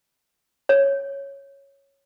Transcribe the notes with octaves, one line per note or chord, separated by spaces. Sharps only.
C#5